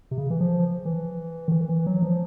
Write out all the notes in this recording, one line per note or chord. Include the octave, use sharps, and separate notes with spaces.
C3
C#3
E3
F3
E3
D#3
E3
E3
F#3
F3